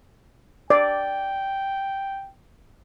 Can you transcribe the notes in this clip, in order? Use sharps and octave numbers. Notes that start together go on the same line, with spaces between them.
D5 G5